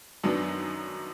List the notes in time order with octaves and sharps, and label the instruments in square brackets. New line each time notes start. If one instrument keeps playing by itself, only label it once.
[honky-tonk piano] F#2 D#3 F#3 B3 D4